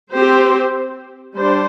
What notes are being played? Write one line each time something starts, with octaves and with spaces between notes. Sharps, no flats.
C4 G4 C5
G3 D4 C5